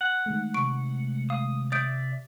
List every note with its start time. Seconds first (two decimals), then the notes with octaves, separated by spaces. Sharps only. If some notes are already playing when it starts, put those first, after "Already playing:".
0.01 F#5
0.26 D#3 G#3 A3
0.54 C3 C#6 D7
1.30 F5 D#6
1.72 D5 E5 D#6 G6 D7